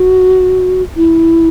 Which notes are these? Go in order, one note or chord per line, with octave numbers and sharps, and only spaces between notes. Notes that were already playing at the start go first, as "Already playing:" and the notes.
Already playing: F#4
E4